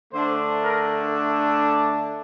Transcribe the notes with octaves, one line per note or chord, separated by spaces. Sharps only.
D3 A3 D4 C5
A#4